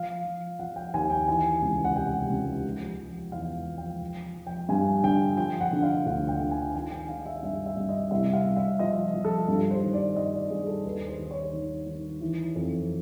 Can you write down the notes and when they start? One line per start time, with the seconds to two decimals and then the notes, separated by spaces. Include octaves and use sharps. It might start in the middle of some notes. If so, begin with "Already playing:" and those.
Already playing: F3 F5
0.25 F3
0.59 F3 F#5
0.76 G5
0.94 D#2 G#5
1.10 G5
1.28 E3 G#5
1.62 C#2
1.85 F#5
1.96 C3 G5
2.30 C#2
2.64 F3
2.98 F3
3.32 E2 F5
3.67 F3
3.78 G5
4.01 F3
4.36 F3
4.47 G5
4.69 G2 G#5
5.03 D3 G5
5.37 F3 G5
5.61 F#5
5.73 D3
5.83 F5
6.06 D2 F#5
6.29 G5
6.40 D3
6.51 G#5
6.74 D#3 G#5
6.92 G5
7.08 D#3 F5
7.26 E5
7.43 G2 E5
7.66 E5
7.77 G2
7.89 D#5
8.11 C2 E5
8.33 F5
8.46 C2
8.56 E5
8.79 F3 D#5
9.14 F3
9.25 A4
9.48 G2
9.71 C5
9.82 D#3
9.93 D5
10.16 G2 D#5
10.34 D5
10.50 G2 G#4
10.67 A4
10.84 D#2 B4
11.07 C5
11.19 D#3
11.31 C#5
11.53 D#3
11.87 D#3
12.21 E3
12.55 F2